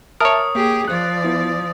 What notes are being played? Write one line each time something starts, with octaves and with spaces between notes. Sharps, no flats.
A#4 C#5 E5 A5 D#6 F6
A#3 G4 G#4
F3 D5 F#6
B3 E4